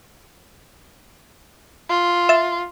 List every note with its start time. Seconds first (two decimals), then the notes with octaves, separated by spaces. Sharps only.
1.89 F4
2.29 E5 A6